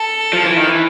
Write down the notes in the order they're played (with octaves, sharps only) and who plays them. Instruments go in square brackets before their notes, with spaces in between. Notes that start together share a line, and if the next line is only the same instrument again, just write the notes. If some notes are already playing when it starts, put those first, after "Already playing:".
Already playing: [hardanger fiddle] A4
[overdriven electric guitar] F3
E3
D#3
E3